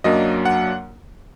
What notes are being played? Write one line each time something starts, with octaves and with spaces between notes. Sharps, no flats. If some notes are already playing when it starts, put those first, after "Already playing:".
F#2 F#3 A#3 D4 D#5
F#5